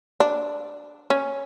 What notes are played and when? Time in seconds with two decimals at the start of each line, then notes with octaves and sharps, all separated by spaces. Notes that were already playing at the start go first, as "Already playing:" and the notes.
0.20 D4
1.10 C#4